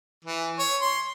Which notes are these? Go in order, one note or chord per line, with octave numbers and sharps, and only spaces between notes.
E3
C#5
C6